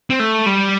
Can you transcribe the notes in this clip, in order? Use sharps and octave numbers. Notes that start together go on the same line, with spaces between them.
C4
A3
G3